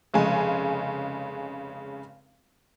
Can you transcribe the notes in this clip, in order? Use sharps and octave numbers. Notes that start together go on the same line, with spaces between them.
F1 C#3 G#3 G#5